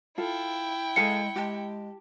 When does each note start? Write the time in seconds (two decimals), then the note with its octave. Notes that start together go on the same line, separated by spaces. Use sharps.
0.18 E4 F4 A4 G5
0.96 G#3 G#4 A4 F5 C#7
1.36 G#3 G4 A5